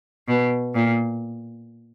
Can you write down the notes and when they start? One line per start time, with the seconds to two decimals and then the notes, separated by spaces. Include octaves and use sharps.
0.28 B2
0.75 A#2